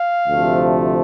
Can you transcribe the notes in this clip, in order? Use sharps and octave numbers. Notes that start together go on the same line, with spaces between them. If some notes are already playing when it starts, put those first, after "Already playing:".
Already playing: F5
D2 C3 F3 A3